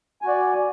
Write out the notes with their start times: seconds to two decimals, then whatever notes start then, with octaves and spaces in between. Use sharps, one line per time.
0.22 G#5
0.25 F#4
0.28 D5